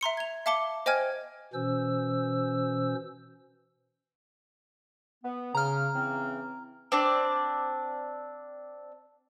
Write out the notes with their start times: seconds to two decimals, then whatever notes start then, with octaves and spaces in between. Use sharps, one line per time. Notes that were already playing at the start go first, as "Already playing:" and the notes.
0.01 E5 A#5 C6 C#7
0.17 G#6 F7
0.46 E5 F5 A5 D6 C#7 G7
0.86 C5 D#5 G5 G#5 F6 G#6
1.54 B2 E3 C#4 C5 E6
5.24 B3
5.55 C#3 A#5 F6
5.94 C#3 E3 C4
6.92 C4 D4 D5